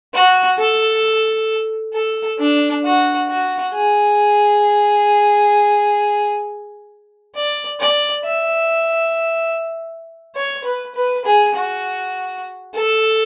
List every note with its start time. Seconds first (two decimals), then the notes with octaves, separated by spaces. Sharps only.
0.13 F#4
0.59 A4
1.93 A4
2.39 D4
2.84 F#4
3.29 F#4
3.74 G#4
7.35 D5
7.79 D5
8.24 E5
10.35 C#5
10.64 B4
10.95 B4
11.25 G#4
11.55 F#4
12.75 A4